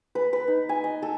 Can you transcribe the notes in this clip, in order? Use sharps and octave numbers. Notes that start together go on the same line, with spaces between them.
B4
B4
D#4
G#5
D#5
A4